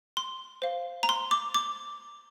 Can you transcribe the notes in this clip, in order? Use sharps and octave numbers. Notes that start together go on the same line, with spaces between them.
C6
C5 F5
A#5
C6
D6
D6